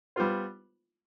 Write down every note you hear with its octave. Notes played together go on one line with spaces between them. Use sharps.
G3 B3 F4 C5